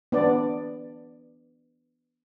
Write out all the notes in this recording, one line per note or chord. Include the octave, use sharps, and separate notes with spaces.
B3 D4 D5